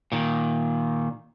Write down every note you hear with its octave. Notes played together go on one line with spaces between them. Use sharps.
A#2 D#3